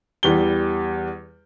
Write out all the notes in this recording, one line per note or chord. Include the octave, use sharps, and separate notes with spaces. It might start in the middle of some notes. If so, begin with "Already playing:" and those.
E2 G3 G7